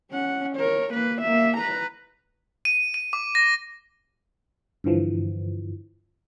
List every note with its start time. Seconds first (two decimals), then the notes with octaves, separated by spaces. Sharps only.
0.11 C#4 F#5
0.56 A#4 C#5
0.93 A#3 B4
1.22 A#3 E5
1.57 B4 A#5
2.65 D#7
2.94 D#7
3.13 D6
3.35 A#6
4.84 G2 D3 E3 F3